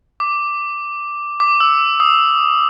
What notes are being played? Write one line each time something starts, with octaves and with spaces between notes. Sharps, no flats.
D6
D6
E6
D#6